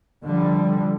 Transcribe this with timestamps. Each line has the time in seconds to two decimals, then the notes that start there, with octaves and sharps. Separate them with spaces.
0.24 D3 F3 G3